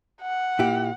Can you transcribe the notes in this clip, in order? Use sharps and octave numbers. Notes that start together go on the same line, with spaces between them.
F#5
A#2 E4 G4